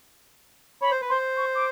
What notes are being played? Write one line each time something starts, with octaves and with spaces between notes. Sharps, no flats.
C#5 B5
C5
B4
C5 C6
C#6
D6